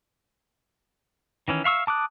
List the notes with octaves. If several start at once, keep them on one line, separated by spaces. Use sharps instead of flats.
D#3 E3 C#4
E5 F5 C#6 E6
A5 D6 D#6 F#6